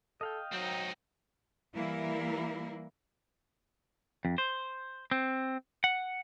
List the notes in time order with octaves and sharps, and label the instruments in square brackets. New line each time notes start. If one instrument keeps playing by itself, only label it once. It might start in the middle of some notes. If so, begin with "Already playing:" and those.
[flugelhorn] A4 [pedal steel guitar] D#5 F5 G5
[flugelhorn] F#3 [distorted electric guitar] C4 D#4
[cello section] E3 G3 A#3 E4 A#4
[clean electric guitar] F2
C5
C4
F#5